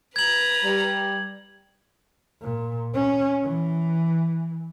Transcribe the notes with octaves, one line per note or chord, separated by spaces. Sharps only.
B4 A#5 G#6 F#7
G3
A#2
C#4
E3